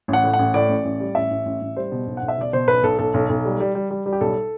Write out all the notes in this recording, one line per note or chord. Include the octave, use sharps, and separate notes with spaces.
A1
F#5
A2
F#5
A1
A2 D5
A1
A1
G3
A1 E5
A1
A1
A1
G3 C5
B2
B1
F#5
B1
E5
B2 D5
B2 C5
B1 B4
B1 A4
B1 A4
B1
B1
G3
G3
G3
G3
G3
G4
B1 A4